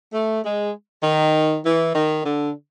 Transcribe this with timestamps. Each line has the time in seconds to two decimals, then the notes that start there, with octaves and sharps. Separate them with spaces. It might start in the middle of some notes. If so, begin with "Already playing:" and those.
0.12 A3
0.43 G#3
1.03 D#3
1.64 E3
1.93 D#3
2.23 D3